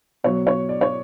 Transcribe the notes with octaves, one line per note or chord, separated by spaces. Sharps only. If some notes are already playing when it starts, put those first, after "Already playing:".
B2 F#3 C#5
C#5
D5
C#5